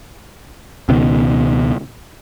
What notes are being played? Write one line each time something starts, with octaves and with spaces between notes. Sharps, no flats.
C#2 B2 D#3